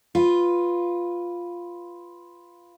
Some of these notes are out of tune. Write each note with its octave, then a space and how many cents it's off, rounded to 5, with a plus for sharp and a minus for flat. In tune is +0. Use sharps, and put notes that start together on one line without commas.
F4 +0 B4 +0